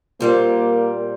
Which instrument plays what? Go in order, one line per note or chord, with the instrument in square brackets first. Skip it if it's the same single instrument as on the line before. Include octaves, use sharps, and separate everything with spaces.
[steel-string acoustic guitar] A#2 G3 C4 [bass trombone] A#3